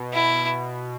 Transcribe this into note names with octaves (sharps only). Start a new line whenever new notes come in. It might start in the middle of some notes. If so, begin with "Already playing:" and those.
Already playing: B2
E4